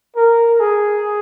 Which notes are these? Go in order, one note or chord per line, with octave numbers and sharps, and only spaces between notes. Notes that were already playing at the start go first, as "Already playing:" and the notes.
A#4
G#4